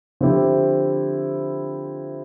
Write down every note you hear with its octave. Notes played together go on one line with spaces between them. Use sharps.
D3 F3 C4 E4 G4